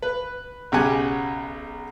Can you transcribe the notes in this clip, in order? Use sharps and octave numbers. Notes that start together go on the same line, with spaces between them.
B4
B1 C#3 G4 F#5 G#5